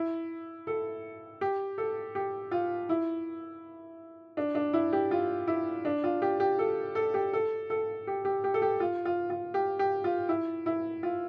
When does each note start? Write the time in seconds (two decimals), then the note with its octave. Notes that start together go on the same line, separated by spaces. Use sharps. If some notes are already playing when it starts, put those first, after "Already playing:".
Already playing: E4
0.67 A4
1.41 G4
1.78 A4
2.15 G4
2.51 F4
2.89 E4
4.37 D4
4.55 D4
4.73 E4
4.93 G4
5.11 F4
5.47 E4
5.85 D4
6.04 F4
6.22 G4
6.40 G4
6.59 A4
6.95 A4
7.14 G4
7.33 A4
7.70 A4
8.07 G4
8.25 G4
8.44 G4
8.54 A4
8.62 G4
8.80 F4
9.05 F4
9.30 F4
9.54 G4
9.79 G4
10.04 F4
10.29 E4
10.66 E4
11.03 F4